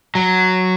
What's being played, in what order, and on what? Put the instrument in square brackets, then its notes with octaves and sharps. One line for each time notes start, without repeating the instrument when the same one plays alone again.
[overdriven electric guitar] F#3